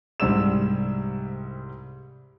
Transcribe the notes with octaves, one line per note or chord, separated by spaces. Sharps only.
C2 G#2 G3 D5 E6 E7